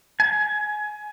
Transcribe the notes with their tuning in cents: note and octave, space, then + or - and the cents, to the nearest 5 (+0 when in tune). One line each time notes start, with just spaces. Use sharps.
G#5 +20